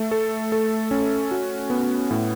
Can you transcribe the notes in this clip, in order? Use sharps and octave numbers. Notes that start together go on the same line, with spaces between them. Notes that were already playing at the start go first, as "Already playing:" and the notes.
Already playing: A3 A4
A4
A4
C#4
F#4
B3
A2